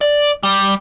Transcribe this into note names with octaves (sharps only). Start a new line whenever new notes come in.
D5
G3